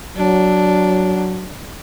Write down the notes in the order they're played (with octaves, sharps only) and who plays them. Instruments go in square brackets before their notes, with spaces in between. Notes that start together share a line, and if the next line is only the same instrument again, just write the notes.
[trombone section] F#3 [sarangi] D4